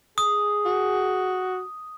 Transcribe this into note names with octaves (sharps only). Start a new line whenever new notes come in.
G#4 D#6
F#4